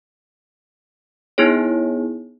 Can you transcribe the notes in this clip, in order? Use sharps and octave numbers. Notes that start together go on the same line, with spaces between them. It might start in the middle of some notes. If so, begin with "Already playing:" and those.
B3 D#4 E4 G#4 C#5